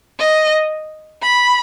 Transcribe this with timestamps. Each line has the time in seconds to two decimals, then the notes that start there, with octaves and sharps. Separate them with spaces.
0.19 D#5
1.22 B5